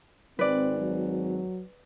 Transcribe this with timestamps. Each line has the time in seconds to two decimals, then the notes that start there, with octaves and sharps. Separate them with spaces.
0.39 G#1 C4 B4 D5
0.78 F#3